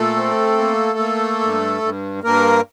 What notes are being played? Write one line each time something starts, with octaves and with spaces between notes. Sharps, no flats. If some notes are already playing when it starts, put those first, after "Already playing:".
Already playing: A#2 A3 A4
C4
A#3
A#3
G2
G2
G2 A#3 A#4